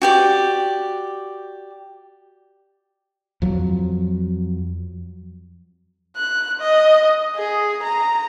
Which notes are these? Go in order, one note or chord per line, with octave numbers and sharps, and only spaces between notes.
F#4 G4 D5
F2 F#3
F#6
D#5
G#4
A#5